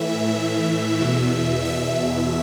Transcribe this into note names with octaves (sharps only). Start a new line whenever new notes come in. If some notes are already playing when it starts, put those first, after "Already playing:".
Already playing: A2 E3 E5
E2 B2
E5